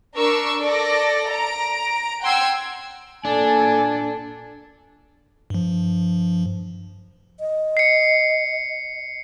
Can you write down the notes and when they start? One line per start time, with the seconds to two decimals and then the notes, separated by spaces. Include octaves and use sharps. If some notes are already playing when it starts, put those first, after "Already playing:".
0.16 D4 A#4 C#6 E6
0.62 A4 D5 A#6
1.32 A#5 D7
2.22 F#5 G5 C6 E6 G#6
3.25 A#2 D4 A4 D5 G#5
5.50 G2 F3
7.40 D#5
7.77 C7 C#7